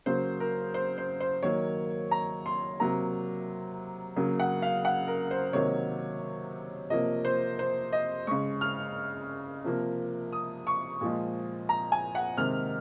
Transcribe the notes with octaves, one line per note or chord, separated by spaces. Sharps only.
C#3 F#3 A#3 C5
A#4
C5
C5
C5
D#3 F#3 A#3 C#5
A#5
C6
C3 F#3 A#3 A#5
C#3 F#3 A#3
F#5
F5
F#5
A#4
C5
C3 D#3 F#3 A#3 C#5
C3 F3 A#3 D#5
C5
C5
D#5
C#3 G#3 C#6
F6
C3 F3 A#3
D#6
C#6
A#2 F3 G#3
A#5
G#5
F#5
C3 D#3 G#3 F6